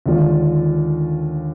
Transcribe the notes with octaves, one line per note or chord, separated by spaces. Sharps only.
D#2 D3 G#3 D4 F4